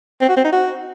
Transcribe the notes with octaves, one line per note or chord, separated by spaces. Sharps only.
C4
F#4
C4
D#4
F#4